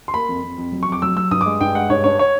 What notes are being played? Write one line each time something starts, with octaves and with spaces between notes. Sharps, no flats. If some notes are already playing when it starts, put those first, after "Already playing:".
C6
A#3 B5
F2
F2
F2
F#3
F2 C#6
D6
F#3 E6
F#3 E6
G2 D#6
G#3 D6
G2 G5
G#3 F#5
G2 C#5
G2 C#5
C#5